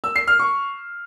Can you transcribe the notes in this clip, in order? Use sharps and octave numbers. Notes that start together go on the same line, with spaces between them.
E6
C7
F6
C#6